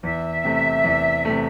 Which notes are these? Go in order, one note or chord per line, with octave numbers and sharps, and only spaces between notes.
E2 E5
C3 A3
E2
C3 A3